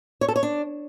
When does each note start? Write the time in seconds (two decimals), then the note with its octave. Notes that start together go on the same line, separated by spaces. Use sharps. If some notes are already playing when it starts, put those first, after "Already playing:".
0.21 C#5
0.28 A4
0.36 C#5
0.43 D4